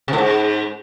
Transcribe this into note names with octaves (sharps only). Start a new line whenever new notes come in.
C3
A2
G#2